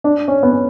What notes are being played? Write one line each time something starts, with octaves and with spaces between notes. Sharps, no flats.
D4
C#4
B3
C#4